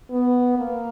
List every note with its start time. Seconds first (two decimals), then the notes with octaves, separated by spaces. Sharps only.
0.10 B3
0.58 A#3